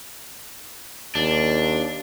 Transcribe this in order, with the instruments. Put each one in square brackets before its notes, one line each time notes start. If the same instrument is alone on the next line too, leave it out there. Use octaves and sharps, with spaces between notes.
[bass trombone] D#2 [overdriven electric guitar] D4